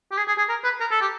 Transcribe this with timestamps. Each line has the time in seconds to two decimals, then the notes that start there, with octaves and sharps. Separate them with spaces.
0.12 G4
0.17 G#4
0.28 G#4
0.38 G#4
0.49 A#4
0.64 B4
0.81 A#4
0.91 A4
1.01 G4